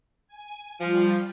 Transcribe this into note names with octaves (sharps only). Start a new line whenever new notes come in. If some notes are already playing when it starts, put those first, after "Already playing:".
G#5
F3 G3 F4